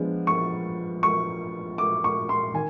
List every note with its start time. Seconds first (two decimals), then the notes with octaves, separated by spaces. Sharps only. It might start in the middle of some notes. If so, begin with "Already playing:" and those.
Already playing: F3 G#3 B3 D4
0.27 C#6
1.03 C#6
1.78 D6
2.04 C#6
2.29 C6
2.54 D#3 G#5